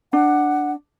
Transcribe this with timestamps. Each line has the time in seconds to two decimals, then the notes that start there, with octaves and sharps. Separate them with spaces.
0.13 D4 F#5